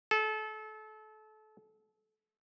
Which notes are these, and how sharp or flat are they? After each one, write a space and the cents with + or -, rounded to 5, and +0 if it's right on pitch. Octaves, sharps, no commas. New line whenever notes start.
A4 -30